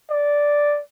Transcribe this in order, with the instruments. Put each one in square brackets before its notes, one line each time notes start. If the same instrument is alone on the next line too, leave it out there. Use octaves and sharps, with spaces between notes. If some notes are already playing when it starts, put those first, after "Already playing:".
[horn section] D5